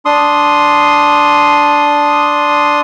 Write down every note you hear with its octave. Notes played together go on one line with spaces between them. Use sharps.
D4 C6 D#6